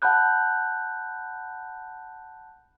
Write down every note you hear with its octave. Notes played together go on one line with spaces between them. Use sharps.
F#5 A5 B5 F#6 G6